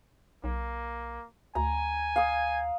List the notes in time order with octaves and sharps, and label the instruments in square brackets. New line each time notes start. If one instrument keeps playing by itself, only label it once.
[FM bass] B1 [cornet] A#3
[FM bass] D2 [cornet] G#5 [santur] A#5
[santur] F5 D#6